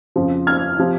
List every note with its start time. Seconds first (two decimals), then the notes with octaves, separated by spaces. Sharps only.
0.16 F2 C#3 F3
0.47 F6 G#6
0.79 C3 F3